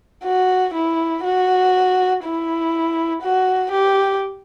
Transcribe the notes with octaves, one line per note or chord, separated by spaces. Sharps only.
F#4
E4
F#4
E4
F#4
G4